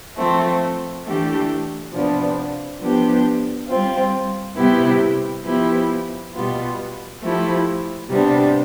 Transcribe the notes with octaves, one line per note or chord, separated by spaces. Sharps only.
F3 A3 C4
E3 A3 D4 G4
C3 F3 B3 D4
F3 B3 D4 G4
G3 C4 F4
C3 G3 B3 E4 G4
F3 B3 E4 G4
B2 G3 B3 F4
F3 A3 E4 G4
C3 G3 B3 D4